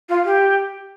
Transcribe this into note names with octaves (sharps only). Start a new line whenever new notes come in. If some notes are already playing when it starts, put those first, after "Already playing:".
F4
G4